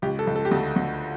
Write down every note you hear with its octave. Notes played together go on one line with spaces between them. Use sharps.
C#2 G4
A4
C#2
A4
G4
D2 A4
D2